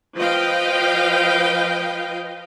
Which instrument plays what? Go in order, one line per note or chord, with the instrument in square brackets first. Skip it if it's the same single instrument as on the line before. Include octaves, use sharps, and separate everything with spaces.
[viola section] F3 B4 D#5 F5 G5